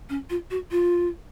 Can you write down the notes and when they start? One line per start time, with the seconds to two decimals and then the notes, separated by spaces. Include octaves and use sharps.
0.10 C#4
0.30 F4
0.51 F#4
0.71 F4